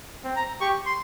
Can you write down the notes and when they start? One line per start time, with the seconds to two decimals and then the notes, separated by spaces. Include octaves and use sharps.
0.24 C4
0.36 A#5
0.61 G4 C#6
0.86 C6